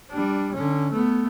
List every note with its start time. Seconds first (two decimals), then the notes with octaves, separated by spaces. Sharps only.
0.11 G3 D4
0.54 D3 C#4
0.92 A3 B3